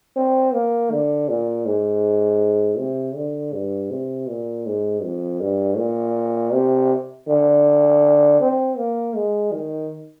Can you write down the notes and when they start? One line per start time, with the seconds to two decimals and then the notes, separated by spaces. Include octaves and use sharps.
0.16 C4
0.53 A#3
0.91 D3
1.29 A#2
1.66 G#2
2.78 C3
3.16 D3
3.54 G2
3.91 C3
4.29 A#2
4.66 G#2
5.03 F2
5.41 G2
5.78 A#2
6.53 C3
7.28 D3
8.40 C4
8.77 A#3
9.16 G#3
9.53 D#3